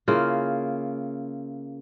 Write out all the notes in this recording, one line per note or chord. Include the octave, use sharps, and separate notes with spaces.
C#3 A#3 E4 F4